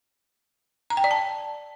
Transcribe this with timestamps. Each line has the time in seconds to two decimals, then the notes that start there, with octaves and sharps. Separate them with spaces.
0.90 A#5
0.97 G5
1.04 D5
1.11 A5